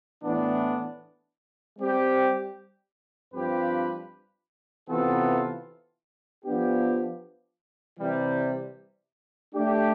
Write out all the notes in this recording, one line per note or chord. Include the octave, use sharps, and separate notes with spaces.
A2 E3 B3 D4
G3 C4 G4
G2 F3 C4 G4 B4
C3 E3 B3 F4 A4
F3 B3 D4 G4
C3 E3 G3
A3 D4 G4